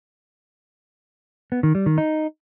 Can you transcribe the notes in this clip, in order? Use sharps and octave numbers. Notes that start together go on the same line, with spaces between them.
B3
D#3
G3
D#3
D#4